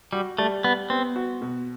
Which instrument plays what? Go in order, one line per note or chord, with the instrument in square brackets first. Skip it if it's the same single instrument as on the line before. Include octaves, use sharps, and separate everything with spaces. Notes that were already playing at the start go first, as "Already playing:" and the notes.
[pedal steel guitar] G3 [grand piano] F#4
[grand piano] G3 [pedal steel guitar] A3
[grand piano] G3 [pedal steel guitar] B3
[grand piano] B3 [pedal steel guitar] C4
[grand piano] F#4
B2